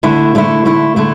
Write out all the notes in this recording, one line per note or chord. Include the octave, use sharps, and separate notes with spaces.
D3 A3 E4
D3 A3 E4
D3 A3 E4
D3 A3 E4